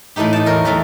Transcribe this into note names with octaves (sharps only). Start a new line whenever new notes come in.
A2 E3 A3 D#4 G4
D#4 A5
E2 A#4 C#5
E2 F#3 A3